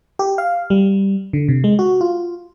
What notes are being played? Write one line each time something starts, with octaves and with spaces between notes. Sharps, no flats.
G4
F5
G3
D3
C3
G#3
F#4
F4